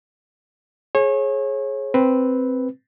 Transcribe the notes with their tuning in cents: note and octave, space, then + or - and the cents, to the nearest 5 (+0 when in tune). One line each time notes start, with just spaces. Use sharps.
G#4 +20 C#5 -30
C4 +0 B4 +0